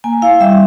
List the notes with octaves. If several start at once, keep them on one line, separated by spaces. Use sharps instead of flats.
A#3 G#5
E4 F5
G3 E5